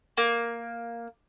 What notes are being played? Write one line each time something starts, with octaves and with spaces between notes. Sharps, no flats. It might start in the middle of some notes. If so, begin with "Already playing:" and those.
A#3